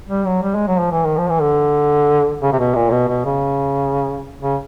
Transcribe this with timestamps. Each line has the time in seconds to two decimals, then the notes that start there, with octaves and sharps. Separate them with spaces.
0.09 G3
0.26 F#3
0.43 G3
0.55 G#3
0.68 F#3
0.80 F3
0.92 E3
1.05 D#3
1.17 F3
1.29 E3
1.42 D3
2.42 C#3
2.53 C3
2.59 B2
2.75 A#2
2.92 B2
3.08 B2
3.25 C#3
4.41 C#3